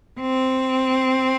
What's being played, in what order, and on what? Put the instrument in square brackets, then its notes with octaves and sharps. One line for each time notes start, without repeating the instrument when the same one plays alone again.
[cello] C4